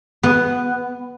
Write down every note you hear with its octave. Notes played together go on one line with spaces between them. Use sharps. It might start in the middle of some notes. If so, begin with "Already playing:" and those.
B3